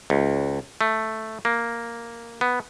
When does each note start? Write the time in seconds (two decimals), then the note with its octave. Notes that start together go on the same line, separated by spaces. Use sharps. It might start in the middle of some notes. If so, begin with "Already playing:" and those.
0.10 C#2
0.81 A3
1.45 A#3
2.41 B3